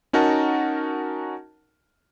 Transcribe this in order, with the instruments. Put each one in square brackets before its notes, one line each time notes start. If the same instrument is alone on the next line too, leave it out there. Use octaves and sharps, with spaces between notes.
[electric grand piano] C#4 D#4 F#4 A#4 F#5 A5